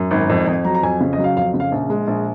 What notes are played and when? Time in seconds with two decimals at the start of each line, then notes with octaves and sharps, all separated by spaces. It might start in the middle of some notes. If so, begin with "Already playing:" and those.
Already playing: F#2
0.11 G#1
0.29 F2
0.47 F2
0.65 F#3 A#5
0.75 A#5
0.83 F2 G#5
1.00 C#3
1.13 D#5
1.18 F#3
1.24 F5
1.37 F2 F5
1.54 C#3
1.60 F5
1.72 A#1
1.90 G#3
2.07 A#1